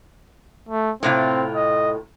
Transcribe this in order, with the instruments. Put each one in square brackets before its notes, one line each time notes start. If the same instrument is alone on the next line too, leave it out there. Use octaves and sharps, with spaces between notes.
[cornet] A3
[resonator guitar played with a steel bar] A2 C3 F4 [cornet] C4
[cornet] D#5